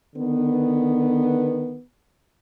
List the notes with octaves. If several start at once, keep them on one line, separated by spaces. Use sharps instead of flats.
D3 D#3 B3